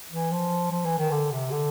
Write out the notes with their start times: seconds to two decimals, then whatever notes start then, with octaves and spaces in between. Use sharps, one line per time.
0.12 E3
0.32 F3
0.71 F3
0.85 E3
0.98 D#3
1.11 D3
1.32 C3
1.51 D3